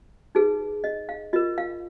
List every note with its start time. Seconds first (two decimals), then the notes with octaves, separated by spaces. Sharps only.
0.35 D#4 G#4 B4
0.84 D#5
1.09 F5
1.33 F4 A#4 D#5
1.58 F5